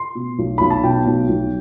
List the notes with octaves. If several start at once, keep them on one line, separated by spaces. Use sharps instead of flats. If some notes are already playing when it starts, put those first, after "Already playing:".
Already playing: C6
B2
B1
B1 B5
A5
B2 G5
B1
B1